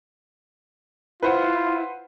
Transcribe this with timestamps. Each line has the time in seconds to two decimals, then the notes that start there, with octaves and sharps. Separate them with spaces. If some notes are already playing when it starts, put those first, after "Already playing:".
1.23 E4 F4 B4 C5 F#5